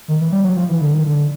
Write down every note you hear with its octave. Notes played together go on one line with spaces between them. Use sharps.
D#3
E3
G3
F#3
F3
E3
D3
D#3
D3